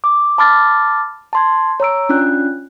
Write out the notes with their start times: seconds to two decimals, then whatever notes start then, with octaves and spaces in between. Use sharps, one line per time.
0.04 D6
0.38 A5 B5 D6 F6 A6
1.33 A5 C6 G#6
1.80 C#5 A#5 E6 D7
2.09 C#4 D4 F4 F#6